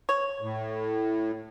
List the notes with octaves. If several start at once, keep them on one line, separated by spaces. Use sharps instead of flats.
C#5
A2